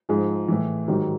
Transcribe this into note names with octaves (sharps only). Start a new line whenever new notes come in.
G#2 F3 G#4
A2 E3
G#2 D#3 F#3 G4